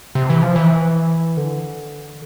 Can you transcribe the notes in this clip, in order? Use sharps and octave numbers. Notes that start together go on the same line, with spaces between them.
C3
E3
F3
E3
D3